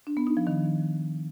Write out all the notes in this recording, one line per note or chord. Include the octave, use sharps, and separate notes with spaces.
D4
B3
D#4
F3
D#3